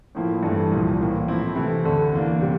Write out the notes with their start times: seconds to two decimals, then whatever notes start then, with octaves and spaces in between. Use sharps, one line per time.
0.15 A2 F3 A#3 E4
0.43 G2 E3 A3
0.72 C2 A#2 F3
1.00 A2 E3 A#3
1.27 A2 F3 C4 E4
1.55 C3 E3 A3 E4
1.85 D2 D3 A3 D4
2.12 E2 E3 A#3 D4
2.41 C3 G3